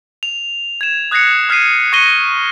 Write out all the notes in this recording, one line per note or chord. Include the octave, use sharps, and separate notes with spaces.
F7
G#6 E7
D#6 F#6 G#6 A#6 C7 C#7
D#6 F6 G#6 B6 C7 D#7
C#6 F#6 A#6 C#7 D#7 G7